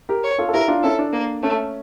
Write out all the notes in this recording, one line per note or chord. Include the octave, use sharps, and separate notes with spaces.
G4 A#4
C#5
F4 A4
A4
E4 G4 A#4
D4 F4
C#4 E4 A4
D4
A#3
A3 C#4